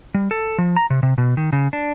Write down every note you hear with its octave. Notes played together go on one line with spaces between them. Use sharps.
G3
A4
F3
A#5
C3
C3
B2
D#3
C#3
D4